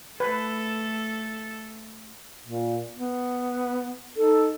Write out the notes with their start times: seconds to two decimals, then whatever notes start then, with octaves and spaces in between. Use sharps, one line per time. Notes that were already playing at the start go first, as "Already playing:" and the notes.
0.20 A3 A4 B4
2.44 A#2
2.96 B3
4.17 D#4 A4